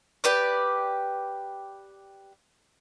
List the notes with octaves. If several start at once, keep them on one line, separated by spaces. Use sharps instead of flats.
G4 B4 D5